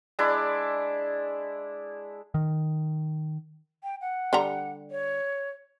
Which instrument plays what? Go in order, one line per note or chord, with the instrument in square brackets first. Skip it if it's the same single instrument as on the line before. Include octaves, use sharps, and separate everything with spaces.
[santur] G#3 D4 E4 D5
[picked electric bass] D#3
[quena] G5
F#5
[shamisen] D3 G3 A#5
[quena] C#5